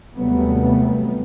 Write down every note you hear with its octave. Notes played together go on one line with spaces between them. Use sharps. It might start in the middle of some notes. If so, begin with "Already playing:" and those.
D#2 C3 F#3 G3 A3 B3